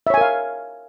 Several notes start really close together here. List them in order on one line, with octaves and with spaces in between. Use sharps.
E5 C#5 G#5 A#4 F5